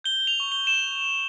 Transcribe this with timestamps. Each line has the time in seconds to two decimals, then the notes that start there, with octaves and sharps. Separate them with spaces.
0.04 G6 G7
0.27 F7
0.40 C#6
0.52 G7
0.67 E7